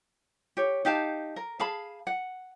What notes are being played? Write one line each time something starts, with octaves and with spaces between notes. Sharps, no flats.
G4 C#5
D#4 G4 F5 A5
A#4
G#4 F5 A5 B5
F#5